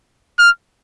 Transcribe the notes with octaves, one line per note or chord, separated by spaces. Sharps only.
F6